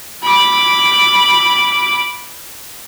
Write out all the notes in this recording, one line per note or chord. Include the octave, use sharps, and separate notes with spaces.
B5 D6